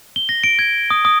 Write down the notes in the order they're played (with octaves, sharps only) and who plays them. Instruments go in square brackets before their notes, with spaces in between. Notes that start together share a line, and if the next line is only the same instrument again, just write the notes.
[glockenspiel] G7
A#6
D7
G#6
D#6
D#6